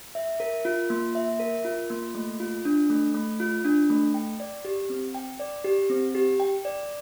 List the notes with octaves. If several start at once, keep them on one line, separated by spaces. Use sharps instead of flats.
E5
A#4
F4
A#3
E5
A#4
F4
A#3
A3
F4
D4
A3
A3
F4
D4
A3
G5
D5
G4
C4
G5
D5
G4
C4
G4
G5
D5